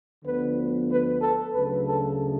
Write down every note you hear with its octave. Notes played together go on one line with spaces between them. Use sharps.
D2 D3 F3 B3 B4
B4
A4
D2 C#3 F#3 B4
A4